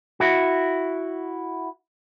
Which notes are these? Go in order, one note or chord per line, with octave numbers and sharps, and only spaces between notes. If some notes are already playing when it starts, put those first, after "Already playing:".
E4 F#4